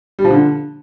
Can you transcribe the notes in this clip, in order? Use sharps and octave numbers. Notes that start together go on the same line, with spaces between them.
G3
F3
D3